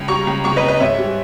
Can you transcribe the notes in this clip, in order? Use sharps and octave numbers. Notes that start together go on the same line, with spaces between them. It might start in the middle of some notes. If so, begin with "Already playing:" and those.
Already playing: C#2
G3 A#5 C#6
C#2
C#2 A#5 C#6
B4 D#5
C#2
B4 D#5
G#2 C#5 E5
G3